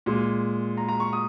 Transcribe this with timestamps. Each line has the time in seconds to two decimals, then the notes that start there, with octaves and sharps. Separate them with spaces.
0.06 A#2 G#3
0.77 A#5
0.89 A#5
1.00 C#6
1.13 D#6